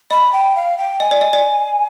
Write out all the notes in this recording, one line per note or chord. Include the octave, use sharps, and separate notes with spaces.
D#5 B5
G5
F5
G5
D#5 G#5
D5
D#5
D5